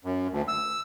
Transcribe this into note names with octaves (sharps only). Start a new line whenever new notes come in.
F#2
D2
E6